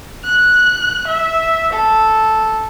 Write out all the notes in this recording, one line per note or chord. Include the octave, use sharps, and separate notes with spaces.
F#6
E5
A4